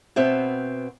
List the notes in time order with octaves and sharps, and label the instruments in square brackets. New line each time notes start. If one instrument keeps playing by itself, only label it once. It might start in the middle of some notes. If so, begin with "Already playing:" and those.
[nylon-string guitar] B2 B3 C4 E5